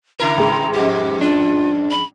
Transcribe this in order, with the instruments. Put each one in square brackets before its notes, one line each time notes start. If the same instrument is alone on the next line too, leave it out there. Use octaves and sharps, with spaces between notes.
[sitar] C#3 E4 A#4 [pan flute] A#5
[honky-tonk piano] A1 G#3 C6
[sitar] F2 G#2 [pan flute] G4
[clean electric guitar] D4 [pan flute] F4
[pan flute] B5